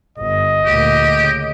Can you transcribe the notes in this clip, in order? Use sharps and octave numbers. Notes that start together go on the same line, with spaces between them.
G1 D#5
D2 A#2 G4
C#3